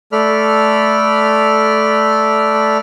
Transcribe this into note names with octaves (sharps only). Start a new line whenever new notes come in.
A3 A4 D5 B5 F6